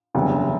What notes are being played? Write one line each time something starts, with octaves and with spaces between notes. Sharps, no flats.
F#1 E2 D3 G3